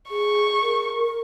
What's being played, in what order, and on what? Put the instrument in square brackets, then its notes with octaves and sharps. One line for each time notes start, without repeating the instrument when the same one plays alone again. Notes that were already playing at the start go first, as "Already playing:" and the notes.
[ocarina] G#4 [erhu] C#6
[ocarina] A#4